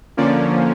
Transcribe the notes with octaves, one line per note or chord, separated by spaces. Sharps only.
D3 F3 A#3 C#4 D5